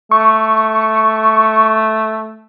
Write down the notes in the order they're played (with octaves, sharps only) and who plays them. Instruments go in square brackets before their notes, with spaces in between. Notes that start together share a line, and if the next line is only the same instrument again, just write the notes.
[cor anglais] A3 [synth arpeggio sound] C#6